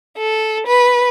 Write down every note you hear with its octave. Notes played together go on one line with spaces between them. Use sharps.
A4
B4